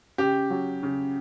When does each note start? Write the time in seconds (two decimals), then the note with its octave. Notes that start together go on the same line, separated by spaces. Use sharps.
0.18 C#3 G4
0.50 F#3
0.83 C#3